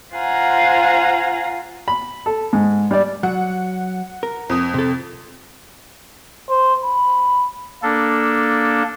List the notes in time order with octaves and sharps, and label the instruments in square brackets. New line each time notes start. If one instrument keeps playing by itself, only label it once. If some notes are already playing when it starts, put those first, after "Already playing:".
[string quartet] F4 C5 F5 F#5 G#5 A#5
[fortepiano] B5
A4
G#2
G3 D5
[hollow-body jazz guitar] F#3 [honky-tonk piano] F#5
[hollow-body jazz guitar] A#4
[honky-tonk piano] F2 D#6
[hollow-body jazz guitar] C3 A4
[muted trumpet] C5
B5
[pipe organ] A#3 D4 A4